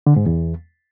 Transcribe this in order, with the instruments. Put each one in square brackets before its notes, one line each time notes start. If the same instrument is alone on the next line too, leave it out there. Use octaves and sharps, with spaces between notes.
[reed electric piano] D3
G#2
E2